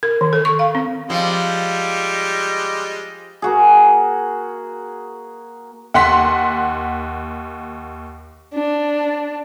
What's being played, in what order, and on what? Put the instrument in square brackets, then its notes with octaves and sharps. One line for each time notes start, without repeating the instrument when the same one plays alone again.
[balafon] A#4
D#3
A4
C#6
F5
C4
[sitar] F3 [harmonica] G3 G#3
[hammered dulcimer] A#3 F#4 G#4
[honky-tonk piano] D#2 F#5 C6 B6
[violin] D4